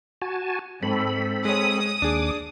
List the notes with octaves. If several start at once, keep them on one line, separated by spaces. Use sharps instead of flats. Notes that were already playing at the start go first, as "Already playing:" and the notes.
F#4 G#5 A5
G#2 C4 A4 B5
G#3 C#5 D#6
D#2 D4 G#4 D6